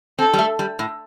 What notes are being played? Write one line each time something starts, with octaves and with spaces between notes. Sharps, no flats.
C4 A4
G3
A3
G3
A2